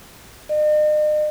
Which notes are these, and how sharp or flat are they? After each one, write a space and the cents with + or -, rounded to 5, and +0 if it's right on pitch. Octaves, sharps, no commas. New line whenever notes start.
D#5 -45